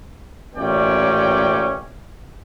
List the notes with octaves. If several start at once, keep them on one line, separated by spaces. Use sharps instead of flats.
A1 A#2 C#4 D5 G5